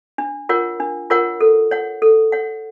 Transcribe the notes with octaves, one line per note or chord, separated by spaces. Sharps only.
D4
F4 A#4 C#5 F#5
D4
F4 A#4 C#5 F#5
A4
C#5 F#5
A4
C#5 F#5